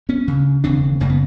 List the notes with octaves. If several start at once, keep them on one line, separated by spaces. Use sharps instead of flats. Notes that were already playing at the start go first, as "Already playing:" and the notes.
B3 C#4
D2 C#3
E1 D#2 C#3 C4 D4
F#1 F#2 C#3 A#3
B3